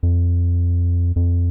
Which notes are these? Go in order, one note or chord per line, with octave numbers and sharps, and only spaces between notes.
F2
F2